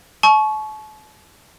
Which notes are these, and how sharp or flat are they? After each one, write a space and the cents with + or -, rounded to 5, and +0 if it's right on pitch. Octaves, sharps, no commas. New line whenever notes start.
A5 -40 C#6 +0